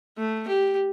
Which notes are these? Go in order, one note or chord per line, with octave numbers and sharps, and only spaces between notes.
A3
G4